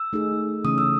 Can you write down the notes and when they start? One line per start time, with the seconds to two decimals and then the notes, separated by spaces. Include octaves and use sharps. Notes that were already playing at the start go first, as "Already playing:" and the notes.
Already playing: E6
0.13 A3 D#4 G#4
0.64 C#3 E3 A3 C#4 D#6
0.78 E6